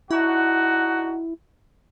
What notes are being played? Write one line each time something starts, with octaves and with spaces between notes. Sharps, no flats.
D3 D#4 E4 F#4